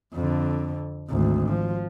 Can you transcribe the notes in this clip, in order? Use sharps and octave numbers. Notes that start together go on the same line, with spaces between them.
F2 D3
G#1 D2
F3